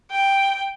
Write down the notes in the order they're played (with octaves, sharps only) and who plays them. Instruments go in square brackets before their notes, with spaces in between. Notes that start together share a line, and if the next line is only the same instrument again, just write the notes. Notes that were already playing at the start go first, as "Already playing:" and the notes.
[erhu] G5